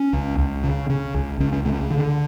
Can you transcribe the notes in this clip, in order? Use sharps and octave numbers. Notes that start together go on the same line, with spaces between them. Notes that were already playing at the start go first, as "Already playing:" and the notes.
Already playing: C#4
C#2
C#2
C#3
C#3
C#2
C#2 C#4
C#4
C#3 A3
D3